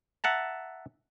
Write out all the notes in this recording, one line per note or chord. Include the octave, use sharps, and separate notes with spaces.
E5 F#5 A5 A#5